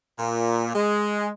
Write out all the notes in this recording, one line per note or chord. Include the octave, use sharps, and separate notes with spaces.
A#2
G#3